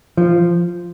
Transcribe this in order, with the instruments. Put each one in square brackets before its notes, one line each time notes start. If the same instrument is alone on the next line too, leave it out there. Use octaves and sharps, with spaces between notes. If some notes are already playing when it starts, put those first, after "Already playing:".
[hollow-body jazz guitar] F3